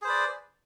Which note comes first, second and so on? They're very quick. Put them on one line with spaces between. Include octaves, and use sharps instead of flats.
G#4 C5 B4 D5